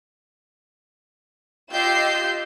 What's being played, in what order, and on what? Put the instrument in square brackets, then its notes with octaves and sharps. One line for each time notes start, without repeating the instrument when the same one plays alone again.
[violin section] F4 G4 D#5 E6 G6 C7